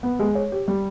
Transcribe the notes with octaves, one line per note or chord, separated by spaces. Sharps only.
B3
G#3
C#5
G4
G3